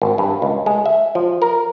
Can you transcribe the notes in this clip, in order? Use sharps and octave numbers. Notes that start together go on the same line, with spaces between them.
G#1
G2
C#2
G#3
E5
F3
A#4